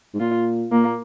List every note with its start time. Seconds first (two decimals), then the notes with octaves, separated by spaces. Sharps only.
0.14 G#2
0.20 A#2 F4
0.72 A#2 A#3